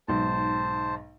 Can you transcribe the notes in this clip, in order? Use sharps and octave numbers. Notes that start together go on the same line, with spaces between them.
B1 G#2 C5 A5